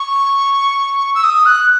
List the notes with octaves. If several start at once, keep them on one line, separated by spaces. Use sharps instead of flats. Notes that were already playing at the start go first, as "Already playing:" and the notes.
Already playing: C#6
E6
D#6
F#6